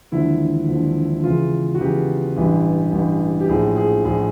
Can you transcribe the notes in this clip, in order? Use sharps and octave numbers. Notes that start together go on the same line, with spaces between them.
E1 D#2 D3 F3 E4
E1 D#2 D3 F3
E2 C#3 E3 F4
F#4
E2 C#3 E3 G4
A1 G2 E3
A1 G2 E3
G4
A#1 A2 F3 G#4
G#4
A#1 A2 F3 G#4